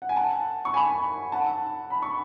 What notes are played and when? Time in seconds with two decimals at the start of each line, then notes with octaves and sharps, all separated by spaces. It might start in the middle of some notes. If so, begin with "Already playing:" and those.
0.02 F#5
0.09 G#5
0.16 F#5 A5
0.65 C#6
0.74 G#5 B5
1.32 F#5 A5
1.90 B5
2.02 C#6